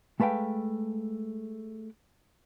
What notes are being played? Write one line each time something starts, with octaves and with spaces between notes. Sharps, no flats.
G#3 A3 B4 F5 G5